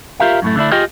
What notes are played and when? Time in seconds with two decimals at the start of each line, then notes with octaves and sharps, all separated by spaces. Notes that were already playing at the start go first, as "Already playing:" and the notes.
0.20 F4 G4 A#4 E5 F5
0.42 F#2 A2 A3
0.56 D3 A3 D4 E4
0.72 F4 G4 G#4 D#5 G5